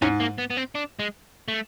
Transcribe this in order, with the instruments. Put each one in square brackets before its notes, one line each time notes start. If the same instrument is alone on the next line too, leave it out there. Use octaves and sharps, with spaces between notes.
[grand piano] G#2 [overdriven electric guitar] C#4
[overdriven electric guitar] A#3
B3
B3
C4
D4
G#3
A3